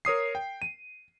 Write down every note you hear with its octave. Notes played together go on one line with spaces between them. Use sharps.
A#4 C#5 D#6 C7
G5
D#7